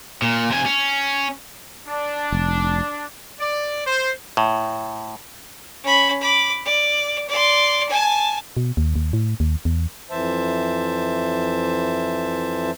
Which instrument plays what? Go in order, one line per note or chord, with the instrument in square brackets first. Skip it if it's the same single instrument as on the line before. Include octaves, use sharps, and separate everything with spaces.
[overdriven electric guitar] A#2
C3 G#5
C#4
[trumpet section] D4
[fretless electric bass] F1
[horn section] D5
C5
[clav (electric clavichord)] A2
[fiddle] C#4 B5
B5 D6
D5
D5 C6
G#5 A5
[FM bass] B2
D#2
D#2
A2
D#2
E2
[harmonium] F2 E3 C5 E5 A5